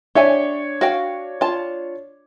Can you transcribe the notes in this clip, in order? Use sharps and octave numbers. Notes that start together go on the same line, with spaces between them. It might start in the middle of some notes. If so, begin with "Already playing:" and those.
D4 G4 C#5 D5 E5 G#5
F#4 F5 G5
F4 A5